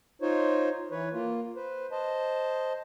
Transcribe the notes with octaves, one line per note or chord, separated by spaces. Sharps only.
D#4 F4 C5 C#5
E3 B4 C#5
A#3 F4
B4 C5
C5 D#5 A5